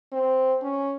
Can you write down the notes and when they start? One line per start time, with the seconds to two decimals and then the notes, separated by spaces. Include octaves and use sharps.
0.12 C4
0.62 C#4